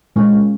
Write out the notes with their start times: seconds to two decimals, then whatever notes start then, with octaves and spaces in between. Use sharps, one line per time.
0.16 A#2 G#3 C#4 F4